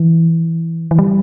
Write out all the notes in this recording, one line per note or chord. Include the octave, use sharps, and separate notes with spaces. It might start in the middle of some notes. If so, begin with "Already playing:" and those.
Already playing: E3
E3
G3